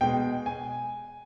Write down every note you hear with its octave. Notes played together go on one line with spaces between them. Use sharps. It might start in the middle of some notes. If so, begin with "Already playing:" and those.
B2 G#3 G5
G#5